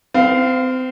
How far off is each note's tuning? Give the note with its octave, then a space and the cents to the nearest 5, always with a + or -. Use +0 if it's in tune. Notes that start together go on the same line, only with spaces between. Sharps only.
C4 -30 F5 +0